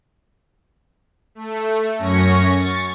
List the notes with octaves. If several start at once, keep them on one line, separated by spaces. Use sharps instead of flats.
A3
F#2 C#4 C#6 A#6 C#7
C#6 A6